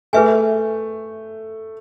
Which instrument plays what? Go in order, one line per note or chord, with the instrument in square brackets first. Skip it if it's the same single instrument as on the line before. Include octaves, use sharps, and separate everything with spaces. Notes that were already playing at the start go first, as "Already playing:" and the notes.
[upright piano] A3 [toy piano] G#4 B4 E5 G#5